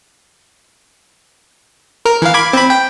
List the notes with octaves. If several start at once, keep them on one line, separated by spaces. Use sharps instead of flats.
A#4
E3 F5
B5 D6 G#6
C4 B5
G5